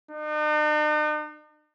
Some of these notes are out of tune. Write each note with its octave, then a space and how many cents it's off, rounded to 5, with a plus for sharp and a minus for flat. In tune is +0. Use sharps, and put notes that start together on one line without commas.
D#4 -45